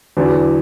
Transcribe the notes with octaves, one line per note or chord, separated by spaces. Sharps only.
E2 D3 F#3 D4